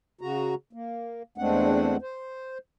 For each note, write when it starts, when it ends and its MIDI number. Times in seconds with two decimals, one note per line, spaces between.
0.21 0.55 49
0.21 0.55 66
0.21 0.55 82
0.73 1.23 58
1.38 1.97 40
1.38 1.97 56
1.38 1.97 57
1.38 1.97 60
1.38 1.97 62
1.38 1.97 78
2.02 2.58 72